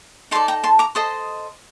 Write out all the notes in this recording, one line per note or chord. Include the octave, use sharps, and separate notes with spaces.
D#4 A4 D5 A5 C6
G5 A#5
A5 C6
A#5 D6
A4 C5 D#5 C6 D#6